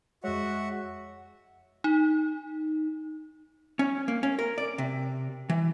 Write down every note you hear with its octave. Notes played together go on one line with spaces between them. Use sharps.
F2 G#3 F#4 C#5 E5 F#5
D#4
C#4
A#3
C#4
A#4
D5
C3
E3